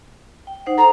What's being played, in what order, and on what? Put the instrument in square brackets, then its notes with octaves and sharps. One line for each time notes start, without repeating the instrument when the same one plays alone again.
[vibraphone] G5
D#4 C5 F#5
[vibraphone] A4 [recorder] A#5